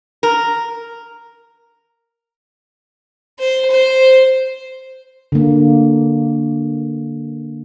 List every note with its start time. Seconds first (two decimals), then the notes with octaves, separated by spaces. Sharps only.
0.23 A#4
3.40 C5
3.71 C5
5.32 D3 A#3